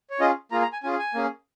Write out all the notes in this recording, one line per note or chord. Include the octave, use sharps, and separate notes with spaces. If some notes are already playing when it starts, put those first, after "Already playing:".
C#5
C#4 F4 G#4 D#5
A#3 F4 G#4 A#5
A#5
G#5
C#4 F4 G#4 G#5
G#5
A#3 C#4 G#4